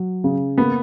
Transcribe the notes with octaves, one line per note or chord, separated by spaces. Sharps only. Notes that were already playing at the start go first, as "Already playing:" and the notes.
Already playing: F#3
C#3
A#3 B3